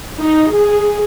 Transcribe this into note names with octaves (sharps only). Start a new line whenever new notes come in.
D#4
G#4